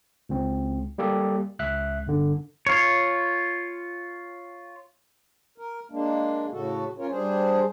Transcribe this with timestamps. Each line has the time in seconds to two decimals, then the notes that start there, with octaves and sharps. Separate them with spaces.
0.29 C#2 C4
0.98 G3 A#3 G4 A4
1.59 C#2 E5 F#6
2.06 G1 D3
2.67 F4 C#5
5.58 A#4
5.92 G#3 A#3 D4
6.52 A2 C#3 F#4 A4
6.98 C#4 F4 A#4 C#5
7.11 G3 D4 G#4 C5